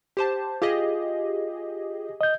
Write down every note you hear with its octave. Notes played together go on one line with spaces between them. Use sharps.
G4 C5 A5
F4 G4 G#4 D#5
D#5 G6